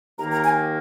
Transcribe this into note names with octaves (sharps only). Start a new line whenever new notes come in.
D#2 D#3 A#3 A#5
A#5
G#5